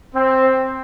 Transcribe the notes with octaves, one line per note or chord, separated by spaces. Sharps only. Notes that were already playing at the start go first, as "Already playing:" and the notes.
C4